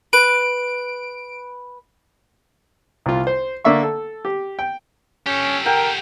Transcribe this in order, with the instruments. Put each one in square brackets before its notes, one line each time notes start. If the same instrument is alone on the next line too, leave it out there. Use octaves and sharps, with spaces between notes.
[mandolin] B4 [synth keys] D7
[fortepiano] C2 F4
C5
D3 A#3 D5 E5 C#6
A4
G4
G5
[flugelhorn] C#4 [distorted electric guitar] G4 A4
[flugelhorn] A#4 [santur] F#5 G5